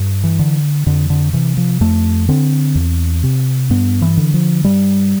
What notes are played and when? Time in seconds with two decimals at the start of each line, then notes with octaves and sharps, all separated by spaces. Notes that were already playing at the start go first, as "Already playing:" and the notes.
Already playing: G2
0.24 E3
0.39 D3
0.86 F2 D3
1.10 D3
1.33 C3 E3
1.57 F3
1.81 F2 A3
2.28 D3 C4
2.75 E2
3.23 C3
3.70 G2 B3
4.02 E3
4.17 D3
4.34 F3
4.64 G2 G3